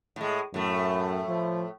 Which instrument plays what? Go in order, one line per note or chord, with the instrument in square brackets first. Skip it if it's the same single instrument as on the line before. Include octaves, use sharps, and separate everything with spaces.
[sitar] A2 G#3
[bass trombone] F#2 [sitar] A2 A3
[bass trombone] F3